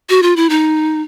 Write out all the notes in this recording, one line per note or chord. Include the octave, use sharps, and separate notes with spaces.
F#4
F4
E4
D#4